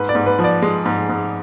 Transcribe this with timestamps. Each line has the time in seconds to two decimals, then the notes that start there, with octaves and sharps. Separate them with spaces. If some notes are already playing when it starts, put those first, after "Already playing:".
Already playing: G#2 B4
0.09 D5
0.15 G#2
0.26 B4
0.39 F3
0.44 D5
0.62 G#3
0.86 G#2
1.09 G#2